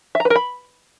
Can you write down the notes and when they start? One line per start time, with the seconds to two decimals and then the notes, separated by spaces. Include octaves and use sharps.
0.15 E5
0.20 A#5
0.25 B4
0.30 A#4
0.36 B5